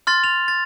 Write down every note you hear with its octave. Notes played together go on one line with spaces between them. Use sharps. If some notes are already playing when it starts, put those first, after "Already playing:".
C6 F6 A6
F7
A6